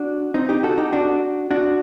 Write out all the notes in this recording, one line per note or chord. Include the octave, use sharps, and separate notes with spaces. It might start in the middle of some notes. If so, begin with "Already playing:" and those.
Already playing: D4 F#4
C4 D#4
D#4 G4
F#4 A4
D#4 G4
D4 F#4
D4 F#4